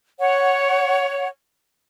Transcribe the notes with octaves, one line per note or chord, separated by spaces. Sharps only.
C#5 F#5